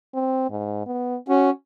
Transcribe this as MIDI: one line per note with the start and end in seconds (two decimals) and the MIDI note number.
0.14 0.48 60
0.51 0.82 44
0.86 1.17 59
1.29 1.50 61
1.29 1.50 66